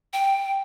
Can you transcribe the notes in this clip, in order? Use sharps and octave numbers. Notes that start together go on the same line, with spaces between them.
G5